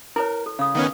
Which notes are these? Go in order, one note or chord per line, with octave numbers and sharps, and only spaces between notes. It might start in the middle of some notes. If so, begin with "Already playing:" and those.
E4 A#4 B4 C#5
A4
C#3 F5 D#6
D#3 B3 C#4